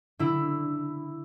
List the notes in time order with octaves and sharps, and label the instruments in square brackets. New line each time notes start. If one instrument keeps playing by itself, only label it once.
[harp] D3 E4